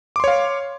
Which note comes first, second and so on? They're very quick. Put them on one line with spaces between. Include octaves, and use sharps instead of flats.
D6 C6 C#5 F5